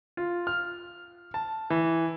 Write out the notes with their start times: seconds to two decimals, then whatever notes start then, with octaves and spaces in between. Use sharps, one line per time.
0.17 F4
0.47 F6
1.34 A5
1.70 E3